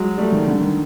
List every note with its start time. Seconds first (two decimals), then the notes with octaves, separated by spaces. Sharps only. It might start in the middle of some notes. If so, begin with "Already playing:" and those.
Already playing: F#3 G#3
0.18 G3 A3
0.32 D#3
0.47 D3
0.61 D#3